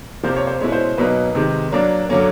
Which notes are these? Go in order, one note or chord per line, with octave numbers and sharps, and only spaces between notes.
C3 F3 A#3 C5
C#5
C5
B2 G#3 C#4 E4 C#5
C5
B2 F#3 A#3 D#4 B4
C3 D#3 G#3
F#3 A#3 D4
D3 F#3 A#3 C#4